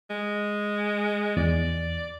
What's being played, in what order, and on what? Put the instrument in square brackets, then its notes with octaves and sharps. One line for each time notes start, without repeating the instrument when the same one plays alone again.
[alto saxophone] G#3
[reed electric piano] E2 [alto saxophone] D5